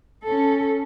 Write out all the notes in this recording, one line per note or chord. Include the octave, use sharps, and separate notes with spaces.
C#4 A4